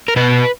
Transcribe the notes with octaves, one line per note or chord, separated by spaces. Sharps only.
A#4
B2 B4